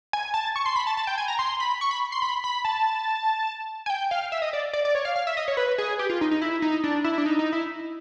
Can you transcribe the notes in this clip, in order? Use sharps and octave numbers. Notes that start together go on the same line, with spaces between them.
G#5
A5
C#6
C6
B5
A5
A5
G5
G#5
A#5
C6
B5
C#6
B5
C6
B5
B5
A5
G#5
G5
F5
E5
D#5
D5
D5
D5
C#5
F5
F5
E5
D#5
C#5
B4
G#4
G4
F4
D#4
D#4
E4
D#4
D4
E4
D4
D#4
D#4
E4